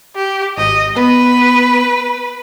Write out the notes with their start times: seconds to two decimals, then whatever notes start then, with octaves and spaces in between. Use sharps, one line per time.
0.16 G4
0.58 G#1 D#5
0.96 B3 B4